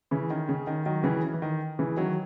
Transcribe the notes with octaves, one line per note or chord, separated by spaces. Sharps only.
C#3 E3
D#3
C#3
D#3
D#3 F#3
C#3 E3
E3
D#3
C#3 E3
D#3 F#3